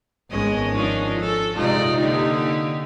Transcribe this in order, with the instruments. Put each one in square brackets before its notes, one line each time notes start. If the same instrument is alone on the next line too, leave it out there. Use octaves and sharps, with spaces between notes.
[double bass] G#1 C#4 [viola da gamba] G#3 B3 D#5
[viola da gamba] F3 D4 D#4
A4
[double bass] C3 D#4 [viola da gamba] G#3 F4 D5
[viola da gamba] D3 A#3 G4